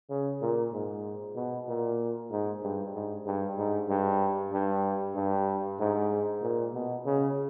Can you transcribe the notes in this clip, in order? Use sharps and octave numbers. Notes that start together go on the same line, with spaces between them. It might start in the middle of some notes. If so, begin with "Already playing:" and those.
C#3
A#2
G#2
B2
A#2
G#2
G2
G#2
G2
G#2
G2
G2
G2
G#2
A#2
B2
C#3